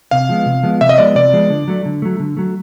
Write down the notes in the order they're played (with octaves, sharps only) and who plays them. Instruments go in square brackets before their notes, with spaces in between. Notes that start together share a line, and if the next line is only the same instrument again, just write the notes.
[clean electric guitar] C3 [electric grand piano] F5
[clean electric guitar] F3 G#3 B3
C3
F3 G#3 B3
[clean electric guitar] C3 [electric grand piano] E5
[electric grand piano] D#5
[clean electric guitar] F3 G#3 B3 [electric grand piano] D5
[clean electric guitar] C3 [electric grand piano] D5
[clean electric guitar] F3 G#3 B3
D3
F#3 A3
D3
F#3 A3
D3
F#3 A3